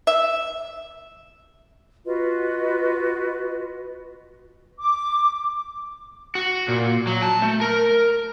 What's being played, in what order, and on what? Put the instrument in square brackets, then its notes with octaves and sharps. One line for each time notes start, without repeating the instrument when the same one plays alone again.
[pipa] E5
[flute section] F4 F#4 B4 D#5
D6
[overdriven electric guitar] F#4
A#2
F#3
A5
A3
A#4